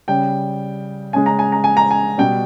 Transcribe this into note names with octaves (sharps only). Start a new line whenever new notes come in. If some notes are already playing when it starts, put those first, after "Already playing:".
C#3 G3 G5
C#3 G#3 G#5
A#5
G#5
A#5
G#5
A#5
G#5
B2 G3 G5